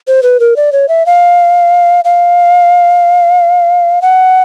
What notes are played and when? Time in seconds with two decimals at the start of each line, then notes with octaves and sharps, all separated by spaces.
0.08 C5
0.23 B4
0.40 A#4
0.56 D5
0.72 C#5
0.89 E5
1.06 F5
2.05 F5
4.02 F#5